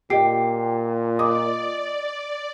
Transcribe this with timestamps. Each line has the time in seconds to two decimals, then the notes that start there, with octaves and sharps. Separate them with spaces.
0.10 A#2 G4 D#5 G5 C7
1.19 D5 D#5 D6 D#6